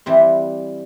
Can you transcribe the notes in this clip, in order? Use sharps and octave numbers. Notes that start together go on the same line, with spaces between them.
E3 G3 C4